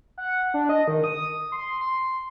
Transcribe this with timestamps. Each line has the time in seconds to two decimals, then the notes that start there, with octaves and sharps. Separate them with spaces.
0.18 F#5
0.54 D4
0.69 D#5
0.87 D#3
1.04 D#6
1.52 C6
1.81 C6